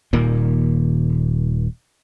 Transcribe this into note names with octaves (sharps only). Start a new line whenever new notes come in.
D#1 A#2 D#3 A#3